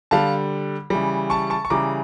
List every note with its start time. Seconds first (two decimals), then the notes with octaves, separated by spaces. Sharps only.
0.11 D3 G3 F5 A5
0.90 C#3 E3 G3
1.30 A5 C#6
1.50 A5 C#6
1.65 C#6
1.70 C#3 E3 G3 A#5 D6